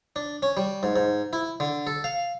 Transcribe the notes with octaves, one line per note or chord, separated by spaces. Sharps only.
D4
C#4
G3
G#2
G#2
E4
D3
A4
F5